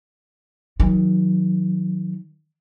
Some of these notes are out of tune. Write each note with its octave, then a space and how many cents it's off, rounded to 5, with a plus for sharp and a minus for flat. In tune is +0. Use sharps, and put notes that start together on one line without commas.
D#3 +20 F#3 -20